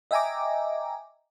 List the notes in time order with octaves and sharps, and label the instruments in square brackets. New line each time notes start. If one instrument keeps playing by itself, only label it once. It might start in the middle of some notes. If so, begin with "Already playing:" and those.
[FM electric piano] D#5 E5 G5 G#5 A#5 D6